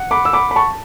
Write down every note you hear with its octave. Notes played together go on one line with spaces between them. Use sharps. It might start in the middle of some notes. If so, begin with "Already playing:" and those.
Already playing: F#5
B5 D6
E6
B5 D6
B5
A5 C#6